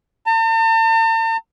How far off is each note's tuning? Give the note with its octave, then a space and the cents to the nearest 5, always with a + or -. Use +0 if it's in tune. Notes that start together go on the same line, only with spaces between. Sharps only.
A5 +45